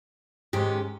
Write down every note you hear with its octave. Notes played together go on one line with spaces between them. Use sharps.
G#2 D#3 G#3 C#4 G4